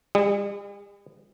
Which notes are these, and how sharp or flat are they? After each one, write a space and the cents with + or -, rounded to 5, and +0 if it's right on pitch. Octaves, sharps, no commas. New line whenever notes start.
G3 +45 G#4 -20